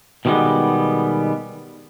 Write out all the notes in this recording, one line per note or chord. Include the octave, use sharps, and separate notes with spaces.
B2 D#3 F3 G3 G#3 B3